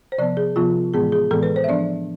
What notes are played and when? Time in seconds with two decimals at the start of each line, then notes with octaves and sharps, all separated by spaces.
0.12 C5
0.18 C3 F3 B3 D5
0.37 G#4
0.56 C3 F3 B3 F4
0.94 A2 E3 G#3 B3 G#4
1.12 G#4
1.31 A2 E3 G#3 B3 A4
1.43 B4
1.56 C5
1.64 E5
1.68 F3 B3 D4 D5